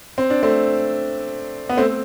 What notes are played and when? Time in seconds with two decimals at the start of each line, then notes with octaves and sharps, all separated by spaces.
0.18 C4
0.30 D4
0.43 A3 C4
1.69 B3
1.77 A3 C4